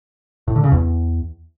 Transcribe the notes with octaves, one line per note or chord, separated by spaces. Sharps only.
A2
D3
C#3
E2